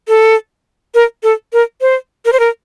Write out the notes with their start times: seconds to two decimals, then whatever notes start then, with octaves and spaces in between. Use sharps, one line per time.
0.08 A4
0.95 A#4
1.23 A4
1.53 A#4
1.81 C5
2.25 A#4
2.33 C5
2.40 A#4